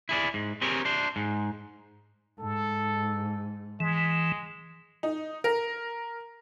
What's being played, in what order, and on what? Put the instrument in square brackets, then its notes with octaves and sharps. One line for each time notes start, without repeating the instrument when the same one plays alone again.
[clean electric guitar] E4 G#4 D5
G#2
C4 G4 G#4 A#4 C#5
D4 C5
G#2
[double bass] G#2 [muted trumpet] A4
[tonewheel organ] E3 [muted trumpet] G#3
[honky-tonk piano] D#4
A#4